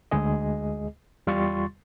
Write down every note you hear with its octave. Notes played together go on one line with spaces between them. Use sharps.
D2 G#3 G#4 D#5
E2 G3 F4 C6 C#6 A6